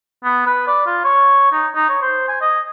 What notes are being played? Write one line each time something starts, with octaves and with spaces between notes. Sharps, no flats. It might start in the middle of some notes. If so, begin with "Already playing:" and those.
B3
B4
D5
F4
C#5
D#4
D#4
C#5
C5
G#5
D#5